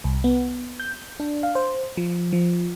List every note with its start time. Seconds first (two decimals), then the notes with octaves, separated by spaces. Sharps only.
0.04 C2
0.24 B3
0.80 G6
1.20 D4
1.43 F5
1.55 C5
1.97 F3
2.33 F3